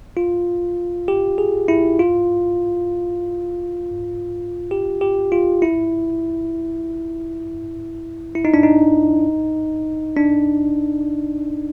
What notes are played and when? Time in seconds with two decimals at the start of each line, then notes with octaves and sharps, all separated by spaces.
0.17 F4
1.08 G4
1.38 G#4
1.68 E4
1.99 F4
4.71 G4
5.01 G4
5.32 F4
5.62 E4
8.35 E4
8.45 D#4
8.54 D4
8.63 D#4
10.17 D4